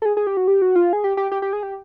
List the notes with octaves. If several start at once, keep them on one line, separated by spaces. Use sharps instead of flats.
A4
G#4
G#4
G4
F#4
G4
F#4
F4
G#4
G4
G4
G4
G4
G#4
G4